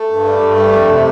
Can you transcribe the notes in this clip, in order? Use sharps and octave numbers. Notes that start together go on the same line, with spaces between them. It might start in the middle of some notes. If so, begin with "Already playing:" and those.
Already playing: A3
G2
G3
G2
G3
F2
C3